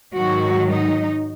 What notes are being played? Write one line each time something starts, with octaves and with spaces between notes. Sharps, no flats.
G#2 D#3 F#3 F#4
D#4